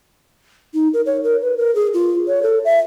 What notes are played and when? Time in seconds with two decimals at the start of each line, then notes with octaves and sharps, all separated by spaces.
0.74 D#4
0.93 A#4
1.06 C#5
1.24 A#4
1.42 B4
1.58 A#4
1.75 G#4
1.94 F4
2.28 C#5
2.43 A4
2.65 E5